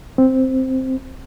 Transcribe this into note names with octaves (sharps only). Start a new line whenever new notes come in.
C4